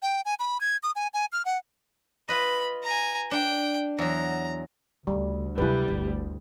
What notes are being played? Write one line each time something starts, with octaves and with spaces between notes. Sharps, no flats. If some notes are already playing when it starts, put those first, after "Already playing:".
G5
G#5
B5
G#6
D#6
G#5
G#5
F6
F#5
F4 B4 D#5 B5
G#5 A#5
D4 G5
E2 F#3 A#5
D2 C#3 G3
C3 F#3 G3 E4 B4
G1 D2